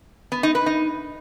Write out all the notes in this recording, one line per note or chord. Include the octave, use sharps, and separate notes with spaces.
B3
D#4
B4
D#4